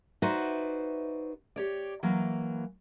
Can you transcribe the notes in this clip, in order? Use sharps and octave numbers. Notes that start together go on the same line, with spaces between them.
D#4 F#4 B4 C5 D5 E5
G4 C#5 D5
E3 F#3 A#3